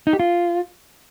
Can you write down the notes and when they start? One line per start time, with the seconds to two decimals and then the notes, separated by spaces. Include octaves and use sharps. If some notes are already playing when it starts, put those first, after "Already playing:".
0.07 D#4
0.13 G4
0.20 F4